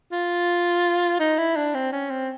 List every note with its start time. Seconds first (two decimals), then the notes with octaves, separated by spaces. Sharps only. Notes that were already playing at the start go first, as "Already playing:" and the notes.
0.12 F4
1.20 D#4
1.38 E4
1.56 D4
1.74 C4
1.92 C#4
2.10 C4